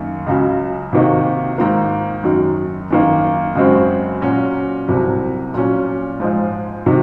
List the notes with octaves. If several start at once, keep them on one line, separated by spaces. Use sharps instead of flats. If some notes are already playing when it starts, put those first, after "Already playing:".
Already playing: F#2 D#3 A#3
C#2 C#3 F#3
C3 D#3 A#3 D#4 F#4
G#2 D#3 A#3
F#2 D#3 F#3
F#2 D#3 A#3
F#2 C#3 G#3 C4 F#4
A#2 F#3 C#4 F#4
C2 C3 F#3
A#2 F#3 C#4
G#2 F3 G#3
C3 D#3 F#3